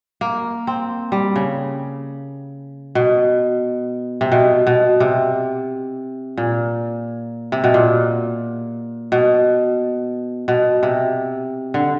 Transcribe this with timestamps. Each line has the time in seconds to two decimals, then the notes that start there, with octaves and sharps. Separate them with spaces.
0.21 A#3
0.67 C4
1.12 G3
1.36 C#3
2.95 B2
4.21 C3
4.32 B2
4.67 B2
5.00 C3
6.37 A#2
7.52 C3
7.64 B2
7.74 A#2
9.12 B2
10.48 B2
10.83 C3
11.74 D3